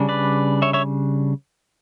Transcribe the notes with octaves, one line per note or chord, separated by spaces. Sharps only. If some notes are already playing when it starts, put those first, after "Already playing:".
Already playing: C#3 G3 D4
B4 D5
C#5 E5
C#5 E5